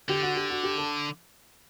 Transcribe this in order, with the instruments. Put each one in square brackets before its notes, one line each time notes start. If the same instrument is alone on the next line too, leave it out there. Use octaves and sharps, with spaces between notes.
[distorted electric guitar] D3 [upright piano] G4
[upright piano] F#4
G4
F#4
G4
A4